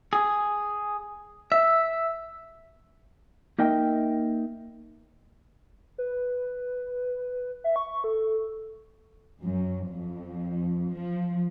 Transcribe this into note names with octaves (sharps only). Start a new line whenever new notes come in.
G#4
E5
A#3 D#4 A#4 D#5 E5 G5
B4
E5
C#6
A4
F#2
F2
F3